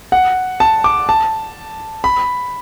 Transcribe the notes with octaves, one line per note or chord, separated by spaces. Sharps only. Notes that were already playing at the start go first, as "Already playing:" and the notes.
F#5
A5
D6
A5
B5